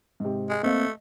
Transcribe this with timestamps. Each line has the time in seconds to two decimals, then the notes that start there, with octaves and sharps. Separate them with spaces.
0.20 G#2 C3
0.50 G#3
0.63 A3 A#3 C4 D#5 F5